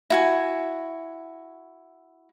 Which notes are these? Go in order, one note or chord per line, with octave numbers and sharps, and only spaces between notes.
E4 F#4 G#5